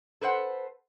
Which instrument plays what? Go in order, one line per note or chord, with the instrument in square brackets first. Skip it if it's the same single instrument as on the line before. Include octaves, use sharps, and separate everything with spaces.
[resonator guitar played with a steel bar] A4 B4 C5 F#5